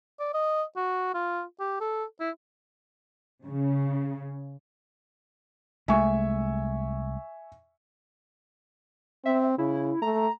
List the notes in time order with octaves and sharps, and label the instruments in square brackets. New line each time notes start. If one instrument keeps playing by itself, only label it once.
[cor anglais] D5
D#5
F#4
F4
G4
A4
E4
[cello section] C#3
[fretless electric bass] C2 G#3 A3 [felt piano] E5 G#5 C#6
[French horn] C4 [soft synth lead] E5
[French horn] C#3 [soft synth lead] E4
[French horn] A3 [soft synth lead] A#5